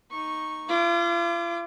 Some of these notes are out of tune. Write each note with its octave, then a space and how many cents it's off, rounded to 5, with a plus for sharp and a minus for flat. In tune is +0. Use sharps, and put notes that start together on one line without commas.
D#4 +0 C#6 -10
F4 -40 D6 +0